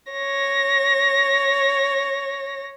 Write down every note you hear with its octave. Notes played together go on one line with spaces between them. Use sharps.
C#5 A#6